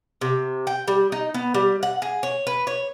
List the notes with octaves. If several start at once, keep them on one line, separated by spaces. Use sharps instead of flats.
C3
G5
G3
D#4
B3
G3
F#5
G#4
C#5
B4
C#5